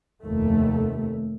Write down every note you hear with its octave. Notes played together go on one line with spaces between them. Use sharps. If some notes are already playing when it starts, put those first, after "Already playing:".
F1 D#2 A3